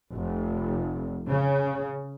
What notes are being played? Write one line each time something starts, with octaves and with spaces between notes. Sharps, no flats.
F1
C#3